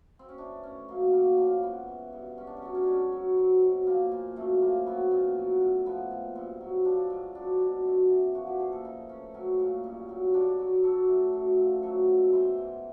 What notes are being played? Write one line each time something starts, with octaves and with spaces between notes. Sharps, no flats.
C4
C#4
E3 D4
A2 C#4
F#2 A#3
F#3 A#3
F3 A#3
G#2 B3
E3
G2
G#2 C#4
D4
C#4
F#3 D4
C#4
G#2 D4
C#4
F#3
F#3 C4
B2
F3 A#3
A#2
F#2 A3
F3 A#3
F#3 B3
A#2
F#3
A2
F3 B3
A#2
G2 C4
F#3
F3 D4
G#2
F#3 D4
B2
F#2
E3
F3 F#4
G4
A#2 G#4
A4
E3 D#4
A2 C#4
F#3 C#4
A#2
G2
F#3
G#2 D4
F#3
F#3 A4
A2
F#2
F3
F#3 A4
B2
E3 C5
G#2